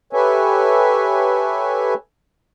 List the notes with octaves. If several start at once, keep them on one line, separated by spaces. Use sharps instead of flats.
G4 A4 B4 C#5 E5 G#5